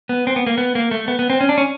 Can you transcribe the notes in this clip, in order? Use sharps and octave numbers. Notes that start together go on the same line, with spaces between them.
B3
C4
B3
A#3
B3
A#3
A3
B3
B3
C4
C#4
D4
C#4